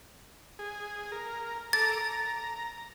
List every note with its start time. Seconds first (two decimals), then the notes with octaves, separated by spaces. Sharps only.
0.59 G#4
1.12 A#4
1.73 A4 A#5 D6 A6
2.00 A#5